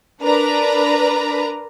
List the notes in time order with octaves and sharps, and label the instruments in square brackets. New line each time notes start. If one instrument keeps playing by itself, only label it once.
[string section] D4 A#4 B4 A#5